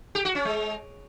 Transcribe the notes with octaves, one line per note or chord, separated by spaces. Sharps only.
G4
F#4
C#4
G#3